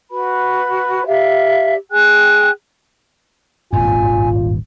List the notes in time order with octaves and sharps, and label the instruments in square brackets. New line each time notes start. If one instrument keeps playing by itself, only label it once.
[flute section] F#4 B4 B5
G4 D5 E5 F5
G#4 G5 G#5 F#6
[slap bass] D#1 G#1 G2 [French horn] F4 [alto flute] G#5